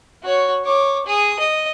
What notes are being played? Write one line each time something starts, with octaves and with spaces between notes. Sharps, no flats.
F#4 C#5
C#5 D6
G#4 D#6
D#5